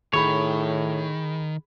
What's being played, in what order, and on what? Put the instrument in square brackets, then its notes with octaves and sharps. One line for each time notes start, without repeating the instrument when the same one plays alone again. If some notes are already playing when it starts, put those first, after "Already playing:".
[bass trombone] A2 [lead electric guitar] D#3 [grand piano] G#4 B5 [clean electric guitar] C#5